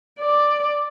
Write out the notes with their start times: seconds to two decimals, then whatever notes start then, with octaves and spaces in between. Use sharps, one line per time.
0.20 D5